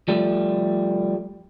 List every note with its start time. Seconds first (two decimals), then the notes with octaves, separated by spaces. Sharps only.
0.08 F3 G3 A3